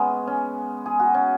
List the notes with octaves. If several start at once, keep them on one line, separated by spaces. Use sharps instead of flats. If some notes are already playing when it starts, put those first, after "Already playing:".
Already playing: G#3 B3 C#4
C#4
G#4
F#4
C#4